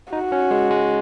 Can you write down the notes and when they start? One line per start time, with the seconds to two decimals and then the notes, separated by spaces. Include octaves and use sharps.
0.13 D#4 F#4
0.32 C#4
0.51 G#3
0.70 G#3